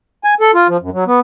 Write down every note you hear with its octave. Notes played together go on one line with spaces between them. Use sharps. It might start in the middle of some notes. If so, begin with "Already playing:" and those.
G#5
A4
F4
F3
F#2
F#3
B3